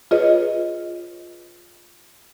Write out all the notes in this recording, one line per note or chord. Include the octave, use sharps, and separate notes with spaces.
F4 G#4 B4 C#5 D#5